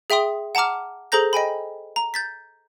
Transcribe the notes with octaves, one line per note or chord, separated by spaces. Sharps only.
G#4 E5 G5 C6 D#6
F#5 A5 A#5 D6 F6
G#4 A4 C5 A#5 G6 A#6
D#5 G5 G#5 B5
A#5
G6 A6 B6